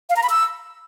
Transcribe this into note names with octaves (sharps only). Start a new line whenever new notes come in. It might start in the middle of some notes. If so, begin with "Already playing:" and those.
F5
A#5
B5
E6